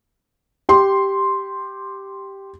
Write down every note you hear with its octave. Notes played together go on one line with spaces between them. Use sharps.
G4 C6